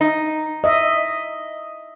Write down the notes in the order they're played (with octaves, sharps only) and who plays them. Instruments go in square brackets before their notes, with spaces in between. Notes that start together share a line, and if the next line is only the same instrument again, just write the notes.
[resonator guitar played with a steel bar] D#4
[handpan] D#5 E5